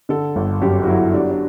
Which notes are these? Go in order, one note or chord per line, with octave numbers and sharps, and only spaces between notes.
D3 A4
G1
F#2 G4
F#4
F#3 E4
G3 D4
D4